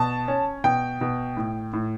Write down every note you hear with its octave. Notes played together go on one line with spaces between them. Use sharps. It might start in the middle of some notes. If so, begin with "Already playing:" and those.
Already playing: B2 A5
C#4
B2 G5
B2
A2
A2